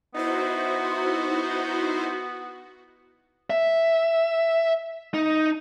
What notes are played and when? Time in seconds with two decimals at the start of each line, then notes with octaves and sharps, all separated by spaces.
0.14 B3 D#4 E4 F#4 C5
3.50 E5
5.14 D#4